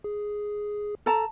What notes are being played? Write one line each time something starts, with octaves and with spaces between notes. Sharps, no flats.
G#4
A4 A5 A#5